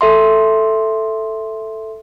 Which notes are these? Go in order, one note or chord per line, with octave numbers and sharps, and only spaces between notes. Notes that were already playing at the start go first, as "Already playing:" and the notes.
A4 E5 C6